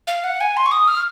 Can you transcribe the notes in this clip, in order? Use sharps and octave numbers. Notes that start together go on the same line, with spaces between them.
F5
F#5
G#5
C6
C#6
D#6
F6